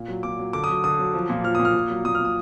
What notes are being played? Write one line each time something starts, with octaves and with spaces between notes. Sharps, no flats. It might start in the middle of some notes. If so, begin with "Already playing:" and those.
Already playing: A#2
F#3
A#2 D6
F#3
D3 D6
D#6
F#3
D3 D#6
F#3
F3
A#2
F3 F6
A#2 D#6
F6
A#2
F#3
A#2 D#6
F6
A#2
D#6